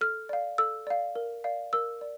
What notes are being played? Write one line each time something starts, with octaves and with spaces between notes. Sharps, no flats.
A4 F6
D5 F5
A4 E6
D5 F5
A#4
D5 F5
A#4 E6
D5